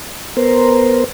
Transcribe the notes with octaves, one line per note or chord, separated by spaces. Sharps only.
B3 A#4 C5